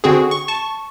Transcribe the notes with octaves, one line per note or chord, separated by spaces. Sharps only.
D3 C4 F#4 G#4
C#6
A5 C#6